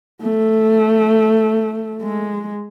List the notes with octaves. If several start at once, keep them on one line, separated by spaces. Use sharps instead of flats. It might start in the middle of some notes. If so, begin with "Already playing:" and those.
A3
G#3